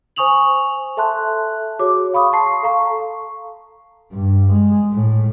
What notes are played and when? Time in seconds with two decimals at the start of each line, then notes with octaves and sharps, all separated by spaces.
0.16 C5 G#5 C#6 D#6 F7 F#7
0.97 A4 E5 A5 C6 F#6
1.79 F#4 G#4 C#5 D6
2.14 F5 B5 C#6 D#6
2.33 A5 C6 C#6 C7
2.63 A4 F5 A#5 C#6
4.12 G2
4.52 G#3
4.92 A2